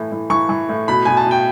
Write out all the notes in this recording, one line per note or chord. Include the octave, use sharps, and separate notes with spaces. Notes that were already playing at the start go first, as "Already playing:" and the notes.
Already playing: A2 E3
A2
E3 C#6
E3
A2
B2 B5
B2 G#5
A5
B2 G5